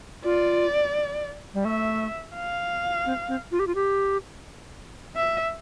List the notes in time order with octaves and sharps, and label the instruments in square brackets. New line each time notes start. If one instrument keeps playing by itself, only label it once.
[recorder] F4 [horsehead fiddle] D5
[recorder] G3
[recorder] A3 [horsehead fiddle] E5
[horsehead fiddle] F5
[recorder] C4
C4
F4
G4
F4
G4
[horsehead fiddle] E5